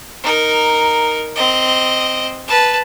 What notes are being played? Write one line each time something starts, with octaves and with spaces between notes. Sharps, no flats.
D#4 A#4
C4 D#5
B4 A5